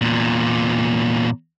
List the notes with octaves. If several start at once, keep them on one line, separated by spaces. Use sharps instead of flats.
E2 A#2